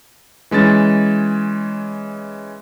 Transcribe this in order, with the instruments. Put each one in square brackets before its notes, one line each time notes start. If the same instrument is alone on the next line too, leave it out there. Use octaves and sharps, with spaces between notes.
[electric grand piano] E3 G#3 C#4 A6